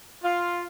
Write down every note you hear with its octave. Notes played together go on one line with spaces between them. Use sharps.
F4